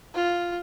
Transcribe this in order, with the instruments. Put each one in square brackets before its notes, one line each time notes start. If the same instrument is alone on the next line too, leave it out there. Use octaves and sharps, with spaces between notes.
[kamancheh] F4